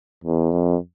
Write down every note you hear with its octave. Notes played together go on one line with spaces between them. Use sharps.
E2
F2